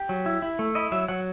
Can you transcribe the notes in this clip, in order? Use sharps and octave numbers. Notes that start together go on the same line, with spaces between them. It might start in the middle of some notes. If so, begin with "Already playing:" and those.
Already playing: G4
F#3
E4
E4
A3
E4 D#5
F#3 E5
F#3 F#5